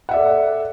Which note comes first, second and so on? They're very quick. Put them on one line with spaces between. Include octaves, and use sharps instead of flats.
F#5 E5 D5 A4